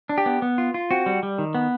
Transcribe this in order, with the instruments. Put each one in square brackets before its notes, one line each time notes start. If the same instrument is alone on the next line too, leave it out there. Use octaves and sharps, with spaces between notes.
[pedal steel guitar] D4
G4
B3
B3
F4
F4
C4 F#4
G3
G3
D#3
B3